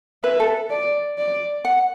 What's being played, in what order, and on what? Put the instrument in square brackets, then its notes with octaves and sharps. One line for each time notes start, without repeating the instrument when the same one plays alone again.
[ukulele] B4 [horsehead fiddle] E5
[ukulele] A4
[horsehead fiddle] D5
D5
[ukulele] F#5